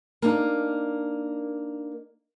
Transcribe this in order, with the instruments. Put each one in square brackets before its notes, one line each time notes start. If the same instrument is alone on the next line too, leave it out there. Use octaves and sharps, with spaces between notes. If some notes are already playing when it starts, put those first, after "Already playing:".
[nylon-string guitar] A#3 D4 D#4